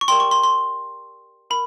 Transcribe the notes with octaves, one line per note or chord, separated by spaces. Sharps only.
C#6
G4 A#4 D5 G5 C6
C#6
C6
C6
A#4 B5